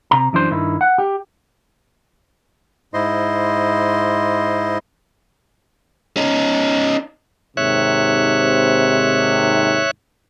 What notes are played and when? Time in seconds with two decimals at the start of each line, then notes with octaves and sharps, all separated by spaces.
0.11 C3 A#5
0.33 F#2 E3 D4 C5
0.50 G2 D#3 E4
0.81 F#5
0.98 G4
2.94 G#2 E4 C5 D#5 C6
6.17 C#4 D#4
7.57 D#2 G#2 C3 C#5 E5 F#6